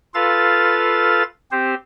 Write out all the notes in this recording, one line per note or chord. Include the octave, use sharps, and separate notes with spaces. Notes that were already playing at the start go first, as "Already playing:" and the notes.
F4 A4 B4 F5 A6
C4 G4 C5